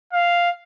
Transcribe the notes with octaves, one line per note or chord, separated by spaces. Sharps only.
F5